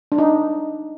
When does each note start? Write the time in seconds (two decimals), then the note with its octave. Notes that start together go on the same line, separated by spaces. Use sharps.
0.12 D4
0.18 D#4